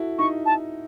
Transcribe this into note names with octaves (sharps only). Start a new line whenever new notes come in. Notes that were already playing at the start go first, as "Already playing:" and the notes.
Already playing: E4 F#4 A4
D#4 C#6
A5